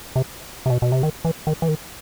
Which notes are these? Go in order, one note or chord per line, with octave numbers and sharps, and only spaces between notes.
C3
C3
B2
B2
C3
D#3
E3
D#3
E3
D#3